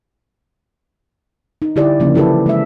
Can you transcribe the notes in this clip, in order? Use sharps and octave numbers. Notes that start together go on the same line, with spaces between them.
D#4
D3 E4 G4 D5
C#3 F3 A#3 C#4
E3 E4 G4 A4 B4
G#3 E5